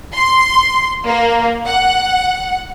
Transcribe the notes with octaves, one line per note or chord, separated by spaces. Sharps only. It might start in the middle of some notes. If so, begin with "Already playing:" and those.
C6
A#3
F#5